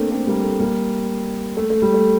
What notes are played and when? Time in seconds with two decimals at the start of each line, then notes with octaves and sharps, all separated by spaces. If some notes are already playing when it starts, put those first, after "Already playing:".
Already playing: A3 A#3 C4 D4
0.11 A3 C4
0.27 G3 A#3
0.44 A3
0.60 G3 A#3
1.57 A3
1.70 A3
1.82 G3
1.94 A3